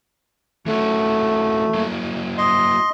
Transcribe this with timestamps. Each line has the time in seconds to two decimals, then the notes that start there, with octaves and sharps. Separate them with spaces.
0.66 E3 A3 C#4 F#4
1.74 F#3 A#3 E4
2.38 D#5 C6